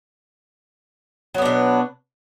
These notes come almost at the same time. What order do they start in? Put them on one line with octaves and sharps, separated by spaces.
F#3 B3 D4 B2